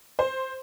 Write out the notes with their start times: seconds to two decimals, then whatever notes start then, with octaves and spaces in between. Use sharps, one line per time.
0.19 C5